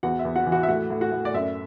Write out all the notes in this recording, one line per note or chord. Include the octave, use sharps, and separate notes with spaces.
E2 F#4 F#5
E5
E2
F#4 F#5
E3
F#4 F#5
E5
A2 F#4 F#5
A2
F#4 F#5
A2
D5
F#2 E5